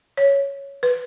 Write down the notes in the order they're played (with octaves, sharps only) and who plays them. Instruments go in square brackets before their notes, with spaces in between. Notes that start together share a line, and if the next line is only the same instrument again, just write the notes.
[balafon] C#5
B4